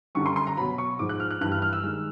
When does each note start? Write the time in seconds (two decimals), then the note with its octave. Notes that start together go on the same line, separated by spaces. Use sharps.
0.15 F#2 D3 G3 C#6
0.26 C6
0.36 C6
0.47 A#5
0.57 B2 F#3 B5
0.78 C#6
0.99 G#2 F3 G#3 D6
1.09 F#6
1.20 F6
1.31 F#6
1.41 G2 E3 G3 F#6
1.52 F6
1.62 F6
1.73 E6
1.83 D#3 G#3 F6